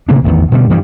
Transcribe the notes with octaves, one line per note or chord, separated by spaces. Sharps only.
A2 C3 A#3 D4
A1 E2 D#3
B2 D3 F#3 G3
G2 E3 F3 G3